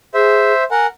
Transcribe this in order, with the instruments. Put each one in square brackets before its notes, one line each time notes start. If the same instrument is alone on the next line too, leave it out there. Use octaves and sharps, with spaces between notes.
[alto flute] G#4 [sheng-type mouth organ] C5 E5
[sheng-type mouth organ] A#4 F#5 [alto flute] G#5